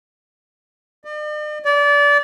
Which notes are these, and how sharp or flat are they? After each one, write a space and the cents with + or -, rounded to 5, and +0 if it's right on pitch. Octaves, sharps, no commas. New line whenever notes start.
D5 +45
D5 -25